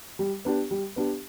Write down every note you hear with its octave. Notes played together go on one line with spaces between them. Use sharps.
G3
B3 D4 G4
G3
B3 D4 G4